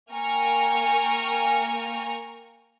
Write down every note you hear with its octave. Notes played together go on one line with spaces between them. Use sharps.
A#3 G5 G#5 A#5 C#6 F6